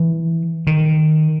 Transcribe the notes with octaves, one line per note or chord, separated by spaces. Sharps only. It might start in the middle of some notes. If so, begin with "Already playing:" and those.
Already playing: E3
D#3